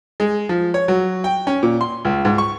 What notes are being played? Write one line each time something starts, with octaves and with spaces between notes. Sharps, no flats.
G#3
F3
C#5
F#3
G5
C#4
A#2
C6
C#2
G#2
C#6